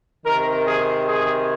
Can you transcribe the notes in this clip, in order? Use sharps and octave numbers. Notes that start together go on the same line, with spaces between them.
C3 D#3 A#4
G#4
G#4